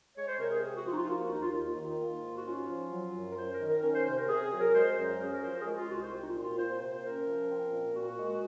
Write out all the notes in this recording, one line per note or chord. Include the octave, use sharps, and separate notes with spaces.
G#3 C#5
C5
C3 A#4
G#4
C4 G#4
F#4
F3 F4
D#4
F4
A#3 F#4
F#4
D#2 D#4
F4
D#2 F4
D#3
A#3
G#2
F#4
C#4 F4
F3
F#3
F#2
A#4
C#4 C5
A#4
D#3
A#4
C#4 A#4
C5
C3 C5
A#4
C3 G#4
G#4
F#3
A#4
G#3 C5
F#2 A#4
C#4 G#4
A#4
F3 C5
A#4
G#4
G#3 F#4
F4
C2 F#4
C5
C4 F#4
D#4
F4
A#2
F4
A#3 C5
C5
C3 C5
C5
C#4 A#4
F3
C4
A#2
A#2 F#4
G#3